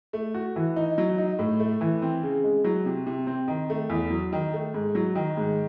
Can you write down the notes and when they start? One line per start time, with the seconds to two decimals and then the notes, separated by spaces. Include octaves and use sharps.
0.13 A3
0.34 F#4
0.56 E3
0.76 D#4
0.98 F#3
1.18 D#4
1.39 A2
1.60 A3
1.81 E3
2.02 C4
2.23 C#3
2.44 G#3
2.64 F#3
2.86 C3
3.07 C3
3.27 C4
3.48 D#3
3.70 A3
3.90 E2
4.10 F#3
4.33 D#3
4.53 A3
4.74 G#2
4.95 F#3
5.15 D#3
5.37 G#2